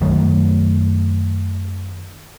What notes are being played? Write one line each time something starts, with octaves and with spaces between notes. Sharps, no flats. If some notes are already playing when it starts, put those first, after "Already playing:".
F#2 D#3 F#3 A3